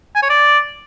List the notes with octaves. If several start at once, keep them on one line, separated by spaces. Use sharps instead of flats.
G#5
C#5
D5